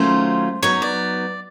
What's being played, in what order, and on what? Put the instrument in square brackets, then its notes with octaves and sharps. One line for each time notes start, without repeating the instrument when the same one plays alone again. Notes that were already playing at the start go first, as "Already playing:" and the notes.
Already playing: [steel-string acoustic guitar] D#3 F#3 A3 C#4 F4 [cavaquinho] C5
[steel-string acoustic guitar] F#3 B3 D#4 [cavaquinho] C#5
[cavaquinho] D5